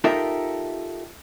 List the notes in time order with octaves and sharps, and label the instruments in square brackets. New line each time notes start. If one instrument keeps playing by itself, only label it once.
[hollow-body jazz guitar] D#4 F4 G4 A4 A#4 E5